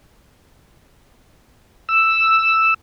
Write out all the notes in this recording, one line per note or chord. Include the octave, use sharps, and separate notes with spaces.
E6